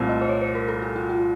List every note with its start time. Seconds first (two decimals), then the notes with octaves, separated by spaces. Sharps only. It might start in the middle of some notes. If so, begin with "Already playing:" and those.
Already playing: C2 A#2 A3 C4
0.09 D#5
0.21 C5
0.29 C#5
0.42 C5
0.55 A#4
0.68 A4
0.82 F#4
0.96 F4
1.09 F4